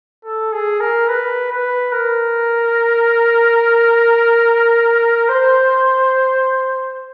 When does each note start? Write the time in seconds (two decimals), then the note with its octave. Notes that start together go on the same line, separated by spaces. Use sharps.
0.25 A4
0.52 G#4
0.80 A#4
1.09 B4
1.51 B4
1.92 A#4
5.29 C5